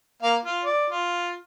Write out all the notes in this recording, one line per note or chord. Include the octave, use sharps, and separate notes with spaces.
A#3 F5
F4
D5
F4